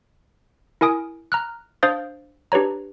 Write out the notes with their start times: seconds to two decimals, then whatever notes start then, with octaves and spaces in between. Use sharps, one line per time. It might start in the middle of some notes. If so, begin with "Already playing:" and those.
0.81 E4 A#4 G#5 D#6 D7
1.32 A#5 F6 F#6
1.83 D4 C5 F5 D#6 A6
2.52 D4 G4 B4 C#5 A#5